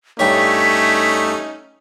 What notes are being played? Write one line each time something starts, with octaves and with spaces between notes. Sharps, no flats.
G2 A3 C#4 D#4 G4 C#5 B6